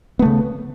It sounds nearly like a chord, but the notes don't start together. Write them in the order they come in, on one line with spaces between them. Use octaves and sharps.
B3 A3 C#3